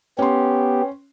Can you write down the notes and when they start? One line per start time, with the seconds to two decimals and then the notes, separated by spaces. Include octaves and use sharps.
0.19 B3 C#4 G4 C6